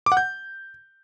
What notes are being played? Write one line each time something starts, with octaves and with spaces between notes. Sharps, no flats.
D6
F#5
G6